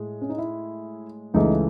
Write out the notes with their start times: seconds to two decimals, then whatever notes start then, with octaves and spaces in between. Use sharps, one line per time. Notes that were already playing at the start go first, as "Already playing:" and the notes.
Already playing: A2 G#3
0.22 C#4
0.30 D#4
0.38 E4
1.34 C#2 C#3 E3 A3 D#4